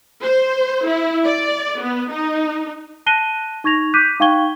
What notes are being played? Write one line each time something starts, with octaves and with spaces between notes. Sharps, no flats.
C5
E4
D5
B3
D#4
A5 F#6 A#6 C7 D#7 G7
D#4 C#6 G#6 A#6 F7
D6 F#6 G6 B6 D#7
D#4 F5 G5 C#6 G#6 G7